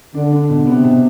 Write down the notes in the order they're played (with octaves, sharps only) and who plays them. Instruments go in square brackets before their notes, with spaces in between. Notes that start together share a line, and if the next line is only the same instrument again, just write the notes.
[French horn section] D3 [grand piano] D4
[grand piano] D4
B2
[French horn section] C3 [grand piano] B3
[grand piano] B2